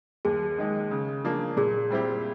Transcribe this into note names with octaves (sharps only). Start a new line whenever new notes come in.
D#2 G#4
D#3 G#3
C#3
F3 A#3 D4
A#2 G#4
G3 C4 E4 G4